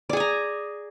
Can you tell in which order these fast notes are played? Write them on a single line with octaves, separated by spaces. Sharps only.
D5 G#4 G#5 A#5